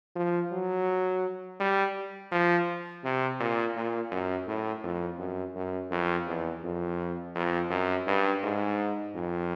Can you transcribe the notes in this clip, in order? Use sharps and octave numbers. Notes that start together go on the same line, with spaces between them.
F3
F#3
G3
F3
C3
A#2
A#2
F#2
A2
F2
F#2
F#2
F2
E2
F2
F2
F#2
G2
G#2
F2